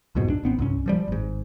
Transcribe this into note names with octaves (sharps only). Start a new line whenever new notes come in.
C2 F2 G#2 B2
D4
G#1 B3 C4
C2 G2 C#4
E3 F3 G3
G#1 G#2